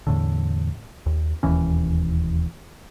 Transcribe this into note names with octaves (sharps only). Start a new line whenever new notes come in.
E2 A2 D3
D#2
E1 D#2 E3 C#4